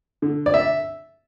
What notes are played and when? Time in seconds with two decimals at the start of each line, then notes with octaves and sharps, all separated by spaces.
0.22 D3
0.46 D5
0.54 E5